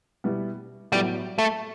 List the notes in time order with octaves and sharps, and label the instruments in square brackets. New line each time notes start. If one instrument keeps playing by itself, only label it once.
[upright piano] B2 G3 B3 E4
[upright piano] A2 F#3 B3 F#4 [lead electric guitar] G3
[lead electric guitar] A3